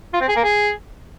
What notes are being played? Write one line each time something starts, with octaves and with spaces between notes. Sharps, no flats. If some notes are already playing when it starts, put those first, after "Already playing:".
F4
C4
G#4
A#3
G#4